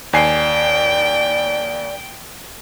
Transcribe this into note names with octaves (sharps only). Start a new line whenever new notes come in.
D#2 D5 G5 G#5 C7